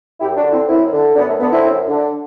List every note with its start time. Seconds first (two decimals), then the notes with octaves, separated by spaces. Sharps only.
0.20 F#2 E4 G4
0.37 D4 F#4
0.44 D3
0.52 C4 E4
0.68 F#2 C4 E4
0.93 D3
1.16 F#2 B3 D4
1.28 A3
1.40 D3 B3
1.52 C4 E4
1.65 F#2
1.88 D3